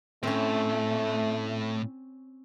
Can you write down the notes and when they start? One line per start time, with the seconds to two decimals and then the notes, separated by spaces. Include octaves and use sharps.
0.23 A2 A3 C4 C#4